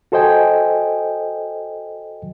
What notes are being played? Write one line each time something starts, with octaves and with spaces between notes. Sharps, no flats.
F#4 A4 C5 D#5 G5 G#5